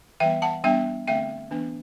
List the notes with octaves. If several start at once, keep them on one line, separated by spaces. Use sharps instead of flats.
E3 G3 B3 E5 G5
F#5 A5
G3 B3 D4 E5 G5
D3 A3 C4 E5 G5
E3 B3 D4